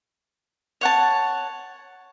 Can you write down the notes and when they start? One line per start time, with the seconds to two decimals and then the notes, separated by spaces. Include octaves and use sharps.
0.81 C#5 F#5 A5